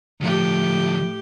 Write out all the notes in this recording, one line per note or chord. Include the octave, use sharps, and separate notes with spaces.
D2 A2 F3 G4